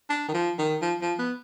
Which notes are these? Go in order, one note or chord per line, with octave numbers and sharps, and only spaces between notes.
D4
D#3
F3
D#3
F3
F3
B3